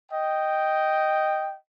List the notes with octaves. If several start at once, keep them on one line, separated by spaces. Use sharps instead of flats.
D#5 G5